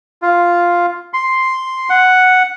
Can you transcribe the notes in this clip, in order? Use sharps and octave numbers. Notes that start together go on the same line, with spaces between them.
F4
C6
F#5